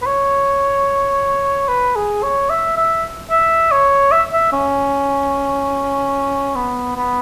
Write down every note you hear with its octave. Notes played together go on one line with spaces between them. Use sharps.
B4
C#5
B4
G#4
C#5
E5
E5
E5
C#5
E5
E5
C#4
B3
B3